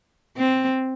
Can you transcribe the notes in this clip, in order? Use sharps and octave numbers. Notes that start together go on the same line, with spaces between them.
C4